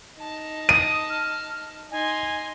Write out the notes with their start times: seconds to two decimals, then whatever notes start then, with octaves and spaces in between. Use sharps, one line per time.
0.18 D#4 A5
0.69 D#6 D#7
1.10 F6
1.91 D#4 G#5 C6